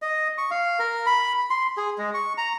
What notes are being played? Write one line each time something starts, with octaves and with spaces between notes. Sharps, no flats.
D#5
C#6
F5
A#4
B5
C6
G#4
G#3
C#6
A#5